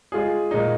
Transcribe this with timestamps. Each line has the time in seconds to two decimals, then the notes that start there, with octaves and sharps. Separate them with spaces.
0.12 G#3 F4 G#4
0.51 A#2 G#3 D#4